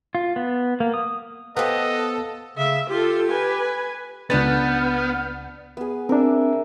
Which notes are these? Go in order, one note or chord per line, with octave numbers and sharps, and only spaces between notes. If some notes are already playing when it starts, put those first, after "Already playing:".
F4
B3
A#3
D#6
B3 G4 A4 C5 D#5 F5 F#5
C#3 E5
F4 G4 A4
B4 G#5
C#2 B3 D4 B4 F#5 F6 G6 A6
B3 G#4
C4 D4 A#4 E5